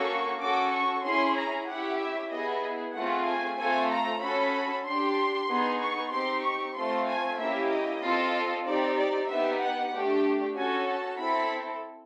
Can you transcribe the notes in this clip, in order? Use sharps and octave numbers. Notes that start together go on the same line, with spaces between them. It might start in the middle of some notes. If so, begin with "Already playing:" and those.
Already playing: A#3 C#4 F#4 A4 C#6
C#4 F#4 A4 D6
C#6
C#4 E4 G#4 C6
A#5
C#4 E4 G4 F#5
E5
B3 E4 G#4 D#5
A3 C4 F4 G#4 F#5
G#5
A3 C4 F4 A4 G#5
A#5
C#4 F#4 A4 B5
D4 G4 C6
B3 D#4 G#4
C#6
C4 D#4 G4 C6
C#6
A3 C4 F4 C6
G#5
A#3 C#4 E4 G4 E5
D#5
C4 F4 A4
C4 D#4 G4 D5
D5
B3 D#4 G4 E5
F#5
A3 D4 G4
C#4 F#4 A4 G#5
A5
C4 E4 A4 B5